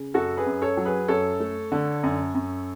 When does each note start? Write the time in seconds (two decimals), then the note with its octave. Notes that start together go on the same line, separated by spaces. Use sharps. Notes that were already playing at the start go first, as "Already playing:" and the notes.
Already playing: C#3
0.14 F#2 F#4 A4
0.37 G#4 B4
0.46 F#2
0.62 A4 C#5
0.77 F#3
0.85 G#4 B4
1.08 F#2 A4 C#5
1.40 A3
1.72 D3
2.03 F#2
2.35 F#2